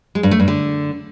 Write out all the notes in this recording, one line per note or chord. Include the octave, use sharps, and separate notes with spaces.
G#3
G2
A3
G2
D3